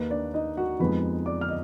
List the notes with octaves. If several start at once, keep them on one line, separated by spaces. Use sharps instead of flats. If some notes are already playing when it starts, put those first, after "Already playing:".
Already playing: D#2 D#3 A#3 D#4 B4
D4 D5
D#4 D#5
F#4 F#5
F2 F3 G#3 B3 D#4 B4 B5
D5 D6
F6
D#5